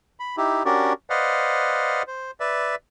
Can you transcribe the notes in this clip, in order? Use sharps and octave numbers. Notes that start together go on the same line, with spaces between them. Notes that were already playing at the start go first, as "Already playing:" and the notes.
B5
D#4 E4 G4
C#4 D4 F#4 G4 A#4 D5
B4 C5 D5 D#5 F5 F#5
C5
B4 D5 E5